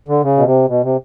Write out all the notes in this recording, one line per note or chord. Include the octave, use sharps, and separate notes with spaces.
D3
C#3
B2
C3
B2
C3